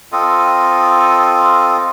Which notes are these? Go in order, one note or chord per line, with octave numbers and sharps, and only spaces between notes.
C4 F4 A4 D#5